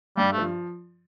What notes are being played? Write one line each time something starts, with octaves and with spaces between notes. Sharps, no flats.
G2 G3
A3
F3